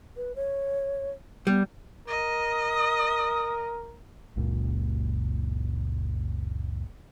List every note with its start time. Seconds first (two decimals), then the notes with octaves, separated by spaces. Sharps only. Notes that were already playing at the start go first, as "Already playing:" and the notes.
0.17 B4
0.36 C#5
1.47 G3 B3
2.08 A#4 D#5
2.74 D#6
4.37 F#1 C#2 A#2